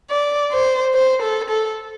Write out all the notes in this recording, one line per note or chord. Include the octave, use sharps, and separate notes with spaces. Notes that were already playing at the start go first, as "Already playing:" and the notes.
D5
C5
C5
A4
A4